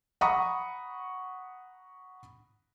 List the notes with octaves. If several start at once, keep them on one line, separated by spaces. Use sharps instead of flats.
F#5 A#5 B5 C#6 D#6